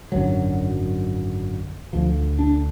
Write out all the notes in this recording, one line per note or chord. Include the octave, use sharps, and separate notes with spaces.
G#1 F#2 D3 F#3
D2 D3 F3
D4